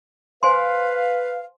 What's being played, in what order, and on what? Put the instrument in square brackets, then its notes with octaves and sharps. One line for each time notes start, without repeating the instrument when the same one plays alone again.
[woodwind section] B4 F5 [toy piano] C5 G#5 C6